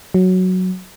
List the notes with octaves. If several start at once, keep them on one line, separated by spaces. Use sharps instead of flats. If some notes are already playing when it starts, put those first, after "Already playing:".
F#3